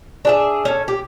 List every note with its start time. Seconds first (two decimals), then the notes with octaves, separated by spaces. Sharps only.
0.25 D4 G#4 E5
0.65 C#4 A4
0.88 G4